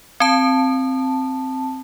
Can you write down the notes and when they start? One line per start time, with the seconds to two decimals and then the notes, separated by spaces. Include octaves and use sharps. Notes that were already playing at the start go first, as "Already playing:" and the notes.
0.20 C4 A5